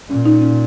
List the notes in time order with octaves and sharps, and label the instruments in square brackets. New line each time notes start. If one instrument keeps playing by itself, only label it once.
[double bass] A#2 [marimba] C#4
[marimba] D#4
C#4